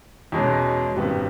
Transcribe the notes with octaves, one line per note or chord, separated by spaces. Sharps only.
E2 B2 G#3 C#4
G#1 F#2 D#3 G3 B3